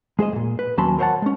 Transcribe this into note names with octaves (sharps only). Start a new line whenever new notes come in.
G#3 G#4 C5 D#5
G2 A#2
B4
D#2 F#3 C#4 A5 B5 C6
A#4 C5 C#5 D#5 F#5 A5
G#3 C#4